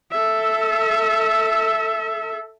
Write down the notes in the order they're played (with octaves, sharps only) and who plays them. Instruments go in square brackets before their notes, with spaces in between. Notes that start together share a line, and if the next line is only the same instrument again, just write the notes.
[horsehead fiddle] A4 E5